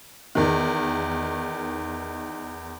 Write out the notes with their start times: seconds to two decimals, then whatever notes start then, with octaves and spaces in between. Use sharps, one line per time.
0.35 E2 D#3